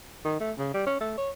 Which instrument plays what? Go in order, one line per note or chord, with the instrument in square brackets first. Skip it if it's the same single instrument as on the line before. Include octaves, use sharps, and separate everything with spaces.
[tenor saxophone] D#3
A3
C#3
G3
C#4
A3
C#5